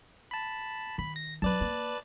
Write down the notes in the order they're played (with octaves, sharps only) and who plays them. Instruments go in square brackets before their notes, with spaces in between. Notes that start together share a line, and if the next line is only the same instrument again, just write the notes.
[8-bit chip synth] A5 B5
[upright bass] D#3 [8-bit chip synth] B5
[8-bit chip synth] A#6
[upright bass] F#3 C#4 [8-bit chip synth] B4 D5 A5
[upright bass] A#3